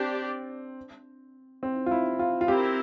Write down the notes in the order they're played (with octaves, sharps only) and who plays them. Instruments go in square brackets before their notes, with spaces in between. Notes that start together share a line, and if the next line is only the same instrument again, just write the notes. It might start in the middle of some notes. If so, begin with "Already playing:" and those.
Already playing: [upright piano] C4 [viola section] D4 G4 D5
[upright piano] C4
F4
E4
F4
F4
[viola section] C4 E4 A#4 [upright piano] G4